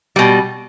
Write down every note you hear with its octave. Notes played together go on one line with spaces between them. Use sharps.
B2 G3